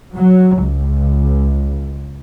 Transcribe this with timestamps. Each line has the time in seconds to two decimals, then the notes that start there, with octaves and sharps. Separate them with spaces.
0.14 F#3
0.61 C#2